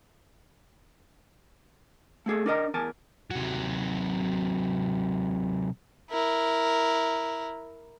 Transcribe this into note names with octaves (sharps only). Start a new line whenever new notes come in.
A3 A#3 G#4 A4
D4 A#4 D#5 A#5
E2 A#4 G#5 A5
C3 F#3
E4 A#4